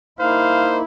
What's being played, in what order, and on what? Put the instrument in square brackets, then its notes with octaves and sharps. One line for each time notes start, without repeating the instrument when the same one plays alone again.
[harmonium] A#3 D#4 [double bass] E4 [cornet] C5 [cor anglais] F5